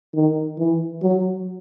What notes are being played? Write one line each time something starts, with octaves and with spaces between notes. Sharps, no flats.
D#3
E3
F#3